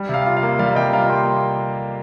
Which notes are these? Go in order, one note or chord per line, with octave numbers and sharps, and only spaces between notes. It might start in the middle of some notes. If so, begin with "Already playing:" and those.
Already playing: G3
C3 F5
F4
F5
A#3
G3 F5
C3 D#5 G5
F4 F5 A#5
A#3 G5 C6